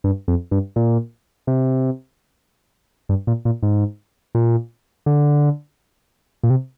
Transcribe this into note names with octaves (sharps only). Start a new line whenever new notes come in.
G2
F2
G2
A#2
C3
G2
A#2
A#2
G#2
A#2
D3
A#2
C3